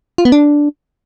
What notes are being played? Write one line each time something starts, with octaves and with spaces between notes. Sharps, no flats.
F4
B3
D4